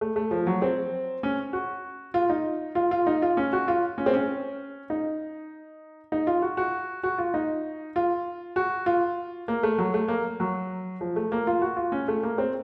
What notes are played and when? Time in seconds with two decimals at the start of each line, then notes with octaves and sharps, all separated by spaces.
0.01 A3
0.16 A3
0.31 F3
0.47 F#3
0.62 C4
1.23 C#4
1.53 F#4
2.14 F4
2.30 D#4
2.75 F4
2.91 F4
3.07 D#4
3.22 F4
3.37 C#4
3.53 F#4
3.68 F4
3.98 C#4
4.06 C4
4.13 C#4
4.90 D#4
6.12 D#4
6.27 F4
6.42 F#4
6.57 F#4
7.03 F#4
7.18 F4
7.34 D#4
7.96 F4
8.56 F#4
8.86 F4
9.48 A#3
9.63 A3
9.78 F#3
9.94 A3
10.08 A#3
10.40 F#3
11.01 F3
11.16 A3
11.32 A#3
11.47 F4
11.62 F#4
11.76 F4
11.92 C#4
12.08 A3
12.23 A#3
12.38 C4